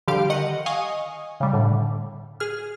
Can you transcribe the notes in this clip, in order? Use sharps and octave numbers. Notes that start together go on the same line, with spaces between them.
D3 F3 G3 G4 F5 D7
D#3 D#5 F#5 C#7
D#5 F5 G#5 C#6 D#6
C#3 G3
A2 D3
G#4 F6